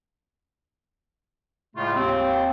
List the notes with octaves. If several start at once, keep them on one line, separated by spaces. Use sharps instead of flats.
A2 C#3 G#3 A3 F4
D#2 C4